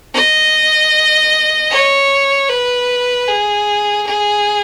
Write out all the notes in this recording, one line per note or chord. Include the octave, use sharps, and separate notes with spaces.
D#5
C#5
B4
G#4
G#4